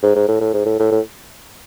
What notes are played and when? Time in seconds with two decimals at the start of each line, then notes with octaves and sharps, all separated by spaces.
0.03 G#2
0.15 G#2
0.28 A2
0.41 A2
0.54 G#2
0.66 A2
0.79 A2
0.92 A2